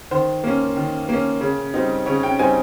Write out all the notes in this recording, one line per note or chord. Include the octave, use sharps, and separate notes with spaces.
D#3 C5
A#3 C#4
D#3
A#3 C#4
C#3
G3 C4 D#4
C#3 C#5
G5
G3 C4 D#4 G#5